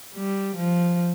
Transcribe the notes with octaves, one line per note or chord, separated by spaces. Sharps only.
G3
F3